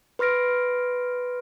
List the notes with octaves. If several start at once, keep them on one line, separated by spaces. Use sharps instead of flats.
B4 C6 F6 A#6 D7